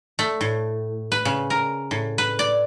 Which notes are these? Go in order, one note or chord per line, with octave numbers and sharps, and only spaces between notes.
A3
A2
B4
C#3
A#4
A2
B4
D5